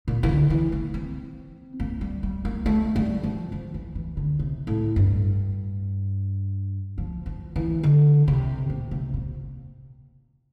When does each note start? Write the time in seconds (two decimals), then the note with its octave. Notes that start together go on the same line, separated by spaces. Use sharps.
0.08 A#2
0.23 E3
0.29 D3
0.50 E3
0.72 A#3
0.94 C4
1.80 A#3
2.01 G3
2.23 G3
2.45 A#3
2.66 A3
2.96 G3
3.23 F3
3.52 F3
3.74 E3
3.95 E3
4.17 D3
4.39 C3
4.67 A2
4.96 G2
6.98 F3
7.26 F3
7.56 E3
7.83 D3
8.28 C3
8.70 A#2
8.91 C3
9.14 A#2